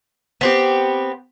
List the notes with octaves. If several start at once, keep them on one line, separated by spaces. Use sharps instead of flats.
B3 C4 G4